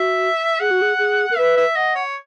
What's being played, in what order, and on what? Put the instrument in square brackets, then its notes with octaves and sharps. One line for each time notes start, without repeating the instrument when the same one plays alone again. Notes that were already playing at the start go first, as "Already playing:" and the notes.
Already playing: [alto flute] F#4 [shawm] E5
[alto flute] G#4 [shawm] F#5
[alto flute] F#4
G#4
G#4
A#4
[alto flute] B4 [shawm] E5
[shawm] E5
[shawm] D#5 [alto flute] F#5
[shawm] C#5